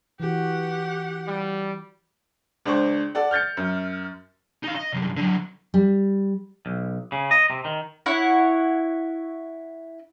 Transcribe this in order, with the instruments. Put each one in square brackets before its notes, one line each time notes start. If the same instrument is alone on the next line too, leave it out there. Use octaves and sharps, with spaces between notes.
[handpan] E3 F#4 [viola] G4 F#5
[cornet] G3
[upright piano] C#2 D4 C5 C#6
A4 D5 F#5
F6 G6 A6 C#7
F#2
[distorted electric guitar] D#4 F5
D#5
C2 F#2
D3 F#3
[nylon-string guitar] G3
[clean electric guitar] B1
C#3
D#5
C3
D#3
[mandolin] E4 C#5 F#5